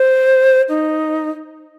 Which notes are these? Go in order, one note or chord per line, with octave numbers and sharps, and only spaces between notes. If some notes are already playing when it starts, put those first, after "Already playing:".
Already playing: C5
D#4